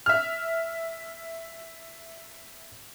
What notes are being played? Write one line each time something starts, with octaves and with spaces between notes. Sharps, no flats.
E5 F6